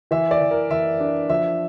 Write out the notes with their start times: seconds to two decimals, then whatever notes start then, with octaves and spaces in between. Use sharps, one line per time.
0.11 E3 E5
0.31 D5
0.41 E3
0.51 A#4
0.70 E3 E5
1.00 D4
1.29 F3 E5